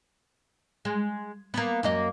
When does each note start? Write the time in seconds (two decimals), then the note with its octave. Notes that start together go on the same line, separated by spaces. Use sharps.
0.85 G#3
1.54 A#3 B3
1.83 F#2 A#3 D#5